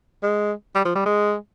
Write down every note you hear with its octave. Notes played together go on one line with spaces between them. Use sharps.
G#3
G3
F3
G3
G#3